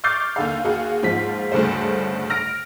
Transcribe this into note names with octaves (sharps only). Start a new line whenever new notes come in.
C#6 D6 F6 G6 A6 C7
D#2 D3 F5
D#2 F#4 G#4 F5
D#2 G#2 F3 F4 B6
D2 G2 C#3 A3 C5
F6 A#6 D7